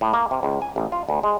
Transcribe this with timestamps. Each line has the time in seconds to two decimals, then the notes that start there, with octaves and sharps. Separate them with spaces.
0.01 A2
0.13 A#3
0.31 C3
0.43 C#2
0.62 G#5
0.76 A1
0.92 F4
1.09 D2
1.23 G#3